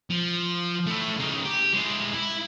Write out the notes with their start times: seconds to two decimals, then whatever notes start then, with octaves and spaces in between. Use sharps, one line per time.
0.10 F3
0.86 A3 E4
1.19 C#3 D#4
1.45 G4
1.73 G#3 E4
2.14 E4